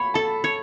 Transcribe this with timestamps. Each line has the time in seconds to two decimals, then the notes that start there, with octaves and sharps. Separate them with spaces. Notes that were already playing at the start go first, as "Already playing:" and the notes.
Already playing: C#5 B5
0.14 A4 A5
0.44 C#5